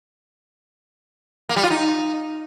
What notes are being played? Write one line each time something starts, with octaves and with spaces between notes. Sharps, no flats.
A#3
G3
F4
D#4